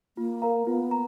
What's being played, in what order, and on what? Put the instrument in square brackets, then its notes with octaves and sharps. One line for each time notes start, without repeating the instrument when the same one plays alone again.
[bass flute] A#3 [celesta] F4
[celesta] A#4 F5 A#5
[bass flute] B3 [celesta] F4
[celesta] A#5